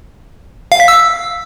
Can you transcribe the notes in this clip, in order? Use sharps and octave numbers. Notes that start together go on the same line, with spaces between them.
F5
B6
E6